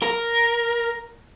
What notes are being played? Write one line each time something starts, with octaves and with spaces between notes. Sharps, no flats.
A#4